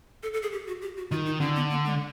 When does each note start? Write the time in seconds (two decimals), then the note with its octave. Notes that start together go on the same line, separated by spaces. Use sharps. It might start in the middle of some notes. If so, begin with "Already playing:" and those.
0.23 A4
0.33 A4
0.42 G#4
0.52 G4
0.67 F#4
0.82 G4
0.97 F#4
1.11 D#3 F4
1.26 D#4
1.40 D3 C#4
1.56 B3
1.70 A#3
1.85 G#3